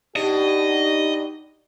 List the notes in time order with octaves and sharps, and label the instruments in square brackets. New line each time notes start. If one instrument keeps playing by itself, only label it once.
[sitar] B2 D4 [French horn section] D#4 G4 [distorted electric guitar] D#5